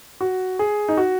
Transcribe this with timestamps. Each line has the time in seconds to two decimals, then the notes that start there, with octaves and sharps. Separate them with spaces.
0.21 F#4
0.59 G#4
0.89 D#4
0.97 F#4